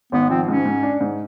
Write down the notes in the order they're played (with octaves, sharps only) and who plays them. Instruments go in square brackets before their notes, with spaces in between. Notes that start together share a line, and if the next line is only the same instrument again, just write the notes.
[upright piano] G#1 [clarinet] B3
[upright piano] F3 [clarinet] C4
[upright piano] G#2 [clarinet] C#4
[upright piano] G#2
D4
G#2